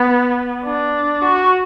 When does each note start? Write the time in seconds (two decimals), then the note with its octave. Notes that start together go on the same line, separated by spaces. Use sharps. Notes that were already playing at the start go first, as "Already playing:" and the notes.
Already playing: B3
0.64 D4
1.22 F#4